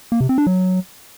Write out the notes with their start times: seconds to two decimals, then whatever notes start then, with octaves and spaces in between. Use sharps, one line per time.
0.12 A#3
0.21 C3
0.29 C4
0.38 D4
0.47 F#3